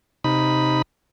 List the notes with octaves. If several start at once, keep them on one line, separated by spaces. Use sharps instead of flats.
C3 D#4 B5